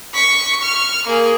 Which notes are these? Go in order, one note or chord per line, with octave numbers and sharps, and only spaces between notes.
C#6 B6
C#6 F6
A#3 G#4